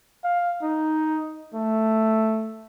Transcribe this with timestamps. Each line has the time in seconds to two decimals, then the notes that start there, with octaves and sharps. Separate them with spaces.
0.24 F5
0.63 D#4
1.54 A3